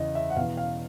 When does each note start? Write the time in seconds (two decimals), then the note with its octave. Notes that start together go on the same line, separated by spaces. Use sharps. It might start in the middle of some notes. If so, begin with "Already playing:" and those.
Already playing: E2 C#3 E3 D#5
0.15 E5
0.30 F#5
0.36 B2 F5
0.40 E2
0.57 F5